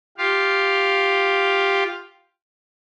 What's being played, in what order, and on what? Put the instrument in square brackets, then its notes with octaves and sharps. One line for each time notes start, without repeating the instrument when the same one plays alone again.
[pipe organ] F4 G4 F5